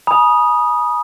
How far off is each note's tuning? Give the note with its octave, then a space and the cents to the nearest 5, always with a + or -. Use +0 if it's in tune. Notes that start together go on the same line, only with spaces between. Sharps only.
G#5 +30 B5 -40 D#6 -5